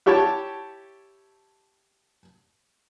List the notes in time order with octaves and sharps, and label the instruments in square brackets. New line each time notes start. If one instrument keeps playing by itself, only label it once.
[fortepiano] E4 G4 C#5 A5